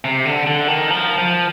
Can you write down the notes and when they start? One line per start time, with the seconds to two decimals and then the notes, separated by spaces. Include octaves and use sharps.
0.04 C3
0.25 D3
0.47 D3
0.68 D#3
0.90 F3
1.18 F3